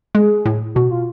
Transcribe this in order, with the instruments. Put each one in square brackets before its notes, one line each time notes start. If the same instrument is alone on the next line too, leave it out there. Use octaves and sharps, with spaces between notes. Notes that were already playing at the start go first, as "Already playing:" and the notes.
[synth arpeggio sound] G#3 [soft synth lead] G#4
[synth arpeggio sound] A2
[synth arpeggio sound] B2 [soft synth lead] F#4
[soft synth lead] F4